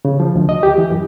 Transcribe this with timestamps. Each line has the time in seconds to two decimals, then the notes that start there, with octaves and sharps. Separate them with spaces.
0.05 C#3
0.20 F3
0.35 D2
0.49 D#5
0.63 G4
0.78 E3
0.91 F#2